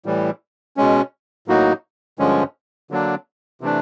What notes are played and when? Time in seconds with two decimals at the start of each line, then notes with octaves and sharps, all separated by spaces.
0.05 A2 E3 G3
0.77 B2 G#3 C#4
1.48 A2 F#3 A#3 D#4 F#4
2.19 G2 D3 F3 G#3 C#4
2.91 D3 F#3 A#3 D4
3.61 C3 E3 A3 D4